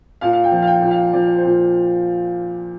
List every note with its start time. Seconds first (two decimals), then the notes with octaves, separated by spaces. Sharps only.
0.21 A#2 F5
0.33 F5
0.44 G5
0.52 F3
0.62 F5
0.67 G5
0.82 A#2
0.91 F5
1.13 F3 D5
1.26 D5
1.37 C5
1.45 A#2